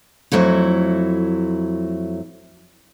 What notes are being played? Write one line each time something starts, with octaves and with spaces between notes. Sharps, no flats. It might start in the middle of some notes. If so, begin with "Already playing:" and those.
F2 F#3 A3 E4